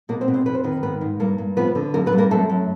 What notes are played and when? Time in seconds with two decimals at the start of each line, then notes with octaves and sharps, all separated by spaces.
0.09 B2 A#3 A#4
0.21 C4 C5
0.28 B2
0.34 C4 C5
0.46 F2 B4
0.55 C5
0.63 D#3 B3 B4
0.83 G#2 B3 B4
1.01 G#2
1.20 G2 A#3 A#4
1.38 G2
1.57 F3 B3 B4
1.75 D3
1.94 F#2 A#3 A#4
2.06 B3 B4
2.13 G3
2.18 A#3 A#4
2.31 F#2 A3 A4
2.49 F#2